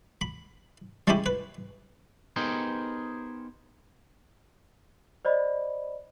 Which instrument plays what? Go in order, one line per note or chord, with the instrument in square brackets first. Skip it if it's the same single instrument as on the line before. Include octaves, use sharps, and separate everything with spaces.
[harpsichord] B5
G3 G#3 C#4 E4 G4 B5
B4
[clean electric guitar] B3 D#4 G4 G#4 A#4 C5
[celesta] C5 D5 D#5 B5